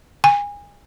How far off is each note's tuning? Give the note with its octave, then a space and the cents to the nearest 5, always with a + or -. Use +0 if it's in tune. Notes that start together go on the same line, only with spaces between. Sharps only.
G#5 -30